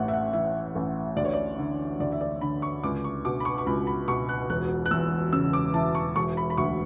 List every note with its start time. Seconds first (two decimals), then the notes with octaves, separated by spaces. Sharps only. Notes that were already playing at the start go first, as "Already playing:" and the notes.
Already playing: A1 A2 F#5
0.08 E5
0.13 F#5
0.33 E3 E5
0.75 A1
1.17 D2 D5
1.25 C#5
1.33 D5
1.58 D3
2.00 D2 D5
2.12 E5
2.21 D5
2.41 D3 B5
2.62 C#6
2.84 C#2 D6
3.04 C#6
3.25 B2 D6
3.40 B5
3.45 C#6
3.58 C#6
3.66 C#2 B5
3.87 B5
4.08 B2 C#6
4.29 F#6
4.49 E1 F#6
4.86 F#6
4.91 E2 E6
5.33 C#3 E6
5.53 D6
5.74 E3 A5
5.95 C#6
6.16 E1 C#6
6.37 B5
6.50 B5
6.57 D2 C#6